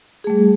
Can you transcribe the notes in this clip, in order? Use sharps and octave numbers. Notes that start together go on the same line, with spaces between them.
G3 A3 G#4